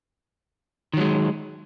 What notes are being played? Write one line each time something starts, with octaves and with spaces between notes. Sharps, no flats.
D#3 F#3 G#3